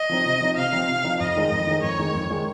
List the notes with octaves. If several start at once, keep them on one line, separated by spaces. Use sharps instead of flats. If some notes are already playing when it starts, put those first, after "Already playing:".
Already playing: D#5
F3 C4 D#4
C3
F3 C4 D#4
C3 F5
F3 C4 D#4
C3
F3 C4 D#4
F2 D#5
D#3 G#3 D#4
F2
D#3 G#3 D#4
F2 C#5
D#3 G#3 D#4
F2
D#3 G#3 D#4